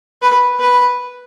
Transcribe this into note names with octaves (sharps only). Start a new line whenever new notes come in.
B4
B4